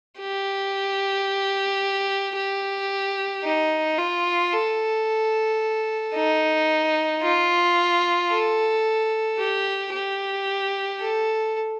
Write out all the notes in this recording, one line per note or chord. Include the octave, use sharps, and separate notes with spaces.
G4
G4
D#4
F4
A4
D#4
F4
A4
G4
G4
A4